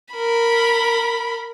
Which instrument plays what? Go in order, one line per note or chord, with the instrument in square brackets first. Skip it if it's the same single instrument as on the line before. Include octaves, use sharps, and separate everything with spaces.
[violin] A#4 B5